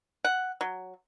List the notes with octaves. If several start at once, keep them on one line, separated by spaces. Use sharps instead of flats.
F#5
F#3